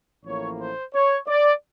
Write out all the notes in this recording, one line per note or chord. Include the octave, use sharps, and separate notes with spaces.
A1 A2 F3 A#3 C#5
C5
C#5
D5